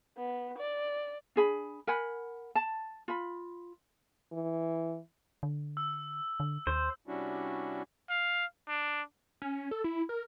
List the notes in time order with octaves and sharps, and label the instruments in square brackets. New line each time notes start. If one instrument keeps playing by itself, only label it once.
[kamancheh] B3
D5
[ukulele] D4 G#4 B5
A#4 F#5 G#5 B5
A5
F4 B5
[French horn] E3
[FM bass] D3
[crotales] E6
[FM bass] D3
[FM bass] D#2 [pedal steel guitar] C5
[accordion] C3 G3 C#4 D4 E4 F#4
[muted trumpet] F5
D4
[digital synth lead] C#4
A4
E4
A#4